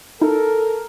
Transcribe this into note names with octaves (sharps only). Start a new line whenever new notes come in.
D#4 E4 A4 A#4